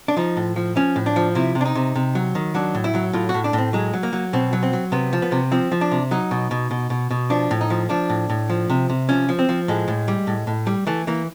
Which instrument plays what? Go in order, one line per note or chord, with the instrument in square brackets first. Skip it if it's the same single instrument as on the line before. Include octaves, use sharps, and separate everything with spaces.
[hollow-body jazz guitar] D4
F3 D#4
A2
F3
F3 C#4
A2
D4
F3
C3 E4
C3
D4
D#4
C3
C3
F#3
D#3
F#3 D4
A2
E4
F#3
A2 F4
F#4
A2
D4
A2
C4
F#3 G#3
F#3
A#3
F#3
B2 C4
F#3
C4
F#3
C3 B3
F3
B3
C3
F3 C4
F3
D4
C3
F#3 D#4
B2
B2
B2
B2
B2
F3 D4
A2
D#4
F3
F3 D4
A2
A2
F3
C3
C3
F3 C#4
F3
C4
F3
A2 G#3
A2
G3
A2
A2
G3
E3 A3
E3 A#3